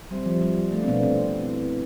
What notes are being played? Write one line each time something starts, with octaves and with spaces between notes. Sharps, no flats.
G3 C4 G4 C5 E5
F3
G3
A3 D4 A4 D5 F5
C4
B2 B3
C3 C4
C4 E4 B4